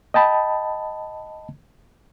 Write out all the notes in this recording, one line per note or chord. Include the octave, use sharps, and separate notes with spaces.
D#5 G5 A5 B5